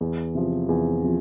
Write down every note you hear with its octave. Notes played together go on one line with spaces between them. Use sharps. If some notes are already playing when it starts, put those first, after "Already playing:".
E2
C3 F3
E2
C3 F3